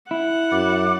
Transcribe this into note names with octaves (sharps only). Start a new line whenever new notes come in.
E4 F#5
F#2 D6